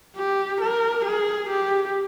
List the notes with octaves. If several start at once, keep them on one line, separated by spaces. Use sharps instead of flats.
G4
A#4
G#4
G4